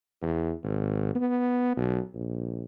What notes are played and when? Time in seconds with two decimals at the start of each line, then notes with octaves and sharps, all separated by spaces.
0.22 E2
0.64 G#1
1.15 B3
1.77 B1
2.14 A#1